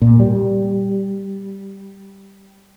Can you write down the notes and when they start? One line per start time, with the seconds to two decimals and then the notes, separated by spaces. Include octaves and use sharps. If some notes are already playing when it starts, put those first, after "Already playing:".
0.02 A#2
0.20 G3